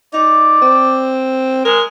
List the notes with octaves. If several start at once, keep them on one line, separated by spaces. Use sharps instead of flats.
D#4 D5
C4
G#3 A#4